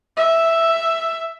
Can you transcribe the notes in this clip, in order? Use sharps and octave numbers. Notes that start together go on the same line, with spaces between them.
E5